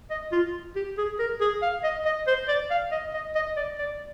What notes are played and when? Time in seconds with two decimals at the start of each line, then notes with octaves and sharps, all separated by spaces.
0.11 D#5
0.32 F4
0.76 G4
0.98 G#4
1.19 A#4
1.41 G#4
1.62 F5
1.84 D#5
2.05 D#5
2.27 C5
2.48 D5
2.71 F5
2.92 D#5
3.14 D#5
3.35 D#5
3.57 D5
3.79 D5